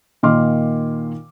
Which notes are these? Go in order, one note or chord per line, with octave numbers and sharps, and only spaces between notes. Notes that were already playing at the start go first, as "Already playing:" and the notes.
A#2 D#3 A#3 C6 D6 F6